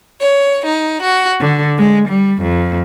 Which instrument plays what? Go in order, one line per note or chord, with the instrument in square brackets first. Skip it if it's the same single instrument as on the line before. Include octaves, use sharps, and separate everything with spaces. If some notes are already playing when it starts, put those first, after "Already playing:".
[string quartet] C#5
D#4
F#4
D3
G#3
G3
F2